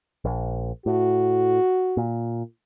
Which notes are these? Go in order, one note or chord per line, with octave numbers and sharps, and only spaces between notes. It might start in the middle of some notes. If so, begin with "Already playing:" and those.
A#1
A2 F#4
A#2